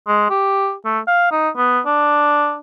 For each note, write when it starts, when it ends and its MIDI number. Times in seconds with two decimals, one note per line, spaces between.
0.08 0.30 56
0.30 0.74 67
0.85 1.00 57
1.08 1.31 77
1.32 1.49 63
1.57 1.80 59
1.86 2.57 62